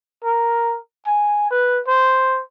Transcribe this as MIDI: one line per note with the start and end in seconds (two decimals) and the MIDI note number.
0.24 0.77 70
1.07 1.50 80
1.51 1.79 71
1.88 2.41 72